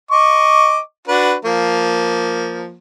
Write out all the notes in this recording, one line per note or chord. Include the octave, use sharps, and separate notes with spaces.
D#5 C#6 D6
D4 F#4 B4
F3 A#3